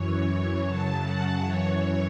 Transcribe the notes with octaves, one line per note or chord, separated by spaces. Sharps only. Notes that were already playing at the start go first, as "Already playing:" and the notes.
Already playing: F#2 E3 C#5
C#5
F#2 C#3 F#3 A5
F#5
F#2 E3 C#5